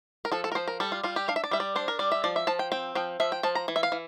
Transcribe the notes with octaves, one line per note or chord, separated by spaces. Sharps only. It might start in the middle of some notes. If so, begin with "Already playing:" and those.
A#4
F3 A4
A4
A#4
F3 C5
A#4
G3 A4
F4
G3 F4
G4
D4 F5
E5
D5
G3 E5
D5
D4 C5
A#4
G3 D5
E5
F3 D5
E5
F3 A5
G5
C4 G5
F3 G5
F3 E5
G5
F3 A5
A#5
E3
E5
F5
E3